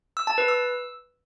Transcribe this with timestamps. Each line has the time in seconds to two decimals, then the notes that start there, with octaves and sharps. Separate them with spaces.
0.17 E6
0.27 A5
0.38 B4
0.48 E6